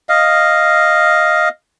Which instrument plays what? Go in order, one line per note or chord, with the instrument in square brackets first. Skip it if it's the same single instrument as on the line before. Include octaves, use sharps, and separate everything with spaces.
[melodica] D#5 F5